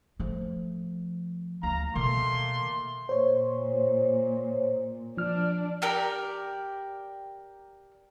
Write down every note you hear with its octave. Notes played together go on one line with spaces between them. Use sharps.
F3 A3
D2 F5 A#5
B2 D#3 A3 A#3 C6
A#2 C5 C#5
F3 D4 F6
G4 A#4 D5